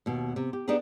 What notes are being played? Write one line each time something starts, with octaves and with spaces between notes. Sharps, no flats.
D#2 B2
C3
G4
B3 D4 D#4 G4 G#4